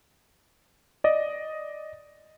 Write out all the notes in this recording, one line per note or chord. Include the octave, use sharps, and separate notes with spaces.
D5 D#5